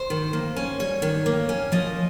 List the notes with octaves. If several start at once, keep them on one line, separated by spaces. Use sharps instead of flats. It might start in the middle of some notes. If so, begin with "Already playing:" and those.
Already playing: C5
D#3
A#3
C#4
G3 C#5
D#3
A#3
C#4
F3 D#5